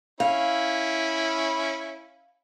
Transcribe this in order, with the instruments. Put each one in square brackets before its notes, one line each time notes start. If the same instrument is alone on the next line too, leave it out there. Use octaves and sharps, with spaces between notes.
[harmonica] C#4 E4 [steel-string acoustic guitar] F5